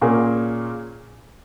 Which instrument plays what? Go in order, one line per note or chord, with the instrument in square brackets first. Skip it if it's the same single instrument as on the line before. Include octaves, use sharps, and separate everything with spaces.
[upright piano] A#2 A#3 C#4 G#4